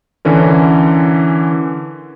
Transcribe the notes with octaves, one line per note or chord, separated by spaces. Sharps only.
D3 E3 C#4 A#4